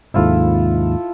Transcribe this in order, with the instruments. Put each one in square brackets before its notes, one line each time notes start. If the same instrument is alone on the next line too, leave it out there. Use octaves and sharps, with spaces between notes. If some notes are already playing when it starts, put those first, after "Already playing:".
[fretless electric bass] D#2 G#2 C3 [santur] E4 F4 A4